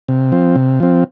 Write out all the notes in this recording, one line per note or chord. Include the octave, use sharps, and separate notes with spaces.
C3
F3 C4
C3
F3 C4